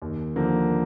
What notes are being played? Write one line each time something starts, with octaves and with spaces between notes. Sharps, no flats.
D#2
D3 F3 A#3